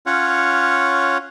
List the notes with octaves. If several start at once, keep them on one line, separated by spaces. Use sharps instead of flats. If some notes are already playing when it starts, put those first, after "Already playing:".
C#4 F4 C#5 F#5